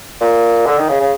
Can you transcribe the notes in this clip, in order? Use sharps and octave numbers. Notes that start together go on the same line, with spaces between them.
A#2
D3
D#3
C#3
C#3